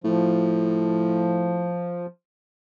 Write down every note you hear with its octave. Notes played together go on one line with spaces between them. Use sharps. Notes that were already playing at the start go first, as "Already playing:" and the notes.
A2 F3